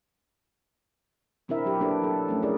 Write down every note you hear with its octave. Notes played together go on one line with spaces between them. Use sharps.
B2 C4 D4 E4 A#4 E5
F#3 G4
A#3 D4 G4 A4 B4
F#3 A4
F3 A3 C#4
E4 G#4 A#4 D5